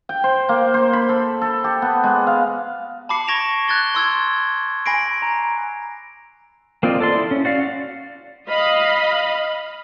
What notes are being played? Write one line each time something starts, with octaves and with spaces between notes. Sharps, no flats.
G5
C5
A#3
C5
B5
A4
A4
G4
B3
G#3
F5
A5 B5 D6 C7 C#7
C#6 G#6 A#6 D7 E7 F7
F#6 G#6 A6 G7
C6 E6 G#6
G#5 B5 A#6 C7 D7
A#5
A#3 C4 F4 D5 D#5
A4 D5 C6
E4
C#4
F#4 D5 F5
D#5 F5 B5